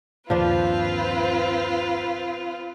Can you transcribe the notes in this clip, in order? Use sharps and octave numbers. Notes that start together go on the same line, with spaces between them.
G1 D#2 A#2 F3 C4 D4 F4 B4